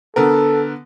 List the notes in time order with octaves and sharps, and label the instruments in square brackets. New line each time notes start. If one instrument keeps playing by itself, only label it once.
[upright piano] D3 B3 A#4 [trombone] A4